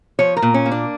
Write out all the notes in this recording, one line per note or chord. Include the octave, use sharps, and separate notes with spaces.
F3 C#5
A#4
A#2
C#4
A#3
D4